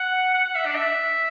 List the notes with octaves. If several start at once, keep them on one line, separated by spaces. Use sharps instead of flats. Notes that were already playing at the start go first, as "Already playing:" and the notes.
Already playing: F#5
F#5
F#5
E5
D4
E5